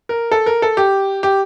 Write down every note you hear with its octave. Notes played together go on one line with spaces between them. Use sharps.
A#4
A4
A#4
A4
G4
G4